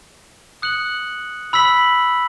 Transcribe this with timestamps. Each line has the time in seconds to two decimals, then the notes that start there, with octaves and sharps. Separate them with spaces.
0.62 D#6 F#6 C#7 F#7
1.53 B5 E6 B6 F#7